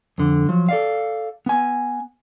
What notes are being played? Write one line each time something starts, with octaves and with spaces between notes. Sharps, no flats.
F2 D3
F3 F#3
A4 D5 F5
B3 G#5